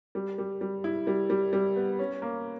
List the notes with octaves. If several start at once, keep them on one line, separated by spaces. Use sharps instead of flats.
G3
G3
G3
E4
G3
G3
G3
B3
C#4
A#3